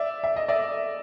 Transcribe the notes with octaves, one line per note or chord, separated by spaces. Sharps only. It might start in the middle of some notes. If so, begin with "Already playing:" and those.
Already playing: D5 E5
E5
D#5
D5 E5